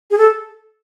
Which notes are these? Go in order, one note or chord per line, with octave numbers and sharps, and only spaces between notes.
G#4
A4